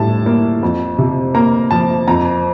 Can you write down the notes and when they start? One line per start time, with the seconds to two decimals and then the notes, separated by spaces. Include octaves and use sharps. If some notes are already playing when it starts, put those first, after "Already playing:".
Already playing: A2 G3 A5
0.26 A#3
0.63 F2
0.98 C3
1.35 A#3 A#5
1.71 F3 A5
2.08 F2 A#5